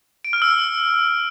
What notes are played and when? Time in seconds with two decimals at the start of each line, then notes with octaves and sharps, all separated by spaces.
0.25 D7
0.33 F6
0.42 E6